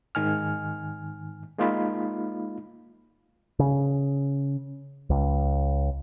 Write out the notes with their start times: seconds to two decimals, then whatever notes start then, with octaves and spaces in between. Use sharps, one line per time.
0.15 G#2 D#3 G#5 F6
1.58 G#3 A#3 D#4 F4 F5 B5
3.59 C#3
5.10 C#2